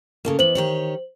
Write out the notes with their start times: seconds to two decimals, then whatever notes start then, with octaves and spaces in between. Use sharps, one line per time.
0.25 C#3 A3 A#3
0.39 E3 B3 C5 F#7
0.55 D#3 G4 C#5